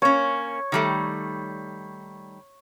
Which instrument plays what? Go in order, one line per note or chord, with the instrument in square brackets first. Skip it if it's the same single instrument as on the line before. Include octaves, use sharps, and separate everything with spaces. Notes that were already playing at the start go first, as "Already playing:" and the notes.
[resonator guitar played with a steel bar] A#3 C#4 [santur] C#5
[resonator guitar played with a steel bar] D#3 G3 A3